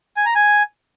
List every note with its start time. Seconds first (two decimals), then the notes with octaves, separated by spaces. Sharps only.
0.16 G#5
0.26 A#5
0.35 G#5